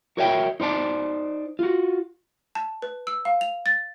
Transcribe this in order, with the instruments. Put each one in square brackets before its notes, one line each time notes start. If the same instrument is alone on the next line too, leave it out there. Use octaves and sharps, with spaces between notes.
[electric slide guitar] F#4 A#4 C#5 D#5 E5 G5
D#4 C5 D5 A5
F4 F#4
[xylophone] A5
B4
E6
F5
F7
A6